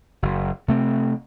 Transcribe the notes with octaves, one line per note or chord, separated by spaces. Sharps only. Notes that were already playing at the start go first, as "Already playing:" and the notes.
F#1
C3 A3 C4